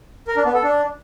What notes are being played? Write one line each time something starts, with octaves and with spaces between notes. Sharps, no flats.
A#4
D4
B3
A4
D4